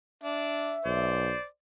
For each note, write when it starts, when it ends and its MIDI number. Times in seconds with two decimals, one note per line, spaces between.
0.24 0.77 62
0.24 1.12 76
0.85 1.34 35
0.85 1.44 72
0.85 1.44 74